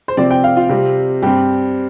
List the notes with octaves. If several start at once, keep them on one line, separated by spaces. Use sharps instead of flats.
C5
C3 F3 C4 D5
G5
F5
F4
C3 G3 C4
G2 G3 C4 G4